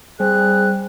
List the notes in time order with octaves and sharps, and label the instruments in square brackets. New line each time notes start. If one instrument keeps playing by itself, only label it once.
[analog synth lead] G3 [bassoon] C4 [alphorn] G#4 [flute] F#6